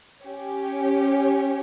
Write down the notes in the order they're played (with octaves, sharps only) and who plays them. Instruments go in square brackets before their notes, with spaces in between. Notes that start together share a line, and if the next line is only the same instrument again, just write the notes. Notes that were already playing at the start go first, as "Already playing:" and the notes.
[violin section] C#4 G4 C#5